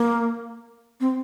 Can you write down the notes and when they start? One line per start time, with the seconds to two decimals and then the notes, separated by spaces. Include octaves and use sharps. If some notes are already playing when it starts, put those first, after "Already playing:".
Already playing: A#3
1.00 C4